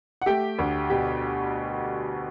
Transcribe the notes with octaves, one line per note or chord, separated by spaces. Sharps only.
F#5
A3 G4 G5
D2
B2 G4 G5